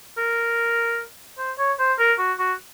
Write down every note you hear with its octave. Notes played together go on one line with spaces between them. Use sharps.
A#4
C5
C#5
C5
A#4
F#4
F#4